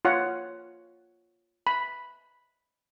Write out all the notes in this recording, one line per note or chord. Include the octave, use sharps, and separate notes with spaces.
F4 C#5 F#5
B5